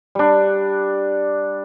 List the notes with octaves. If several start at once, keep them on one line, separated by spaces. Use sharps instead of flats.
G3 D4